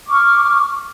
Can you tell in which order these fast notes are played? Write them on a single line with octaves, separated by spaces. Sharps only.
D6 C#6 F6